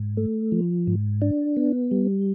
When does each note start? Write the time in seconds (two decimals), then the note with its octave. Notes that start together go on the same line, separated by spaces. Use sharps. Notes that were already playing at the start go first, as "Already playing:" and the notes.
Already playing: G#2
0.17 A3
0.52 F3
0.87 G#2
1.22 D4
1.57 B3
1.91 G3